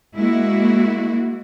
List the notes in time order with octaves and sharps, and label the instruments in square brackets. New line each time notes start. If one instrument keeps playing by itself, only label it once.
[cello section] G#3 A#3 E4 F#4